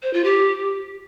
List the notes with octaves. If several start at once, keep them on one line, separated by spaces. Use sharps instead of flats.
C5
F4
G4